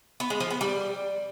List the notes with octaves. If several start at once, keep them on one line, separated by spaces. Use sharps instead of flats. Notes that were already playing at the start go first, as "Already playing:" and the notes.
B3
G#3
F3
B3
G3